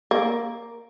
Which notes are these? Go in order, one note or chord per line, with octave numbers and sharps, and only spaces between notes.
A#3